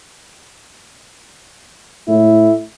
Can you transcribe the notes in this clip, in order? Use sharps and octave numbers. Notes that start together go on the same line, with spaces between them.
A2 E4